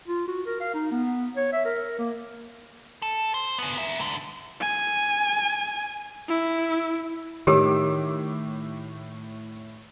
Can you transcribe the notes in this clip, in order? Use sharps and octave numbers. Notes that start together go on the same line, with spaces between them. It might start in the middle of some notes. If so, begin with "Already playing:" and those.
F4
F#4
A#4
F5
D#4
B3
C#5
E5
A#4
A#3
A4
C5
C#3 B3
D#2 E5
G#2 D3
G#5
E4
A2 D#3 G4 C#5 D6 E6